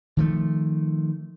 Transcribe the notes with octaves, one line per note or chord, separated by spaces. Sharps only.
D#3 F3 A3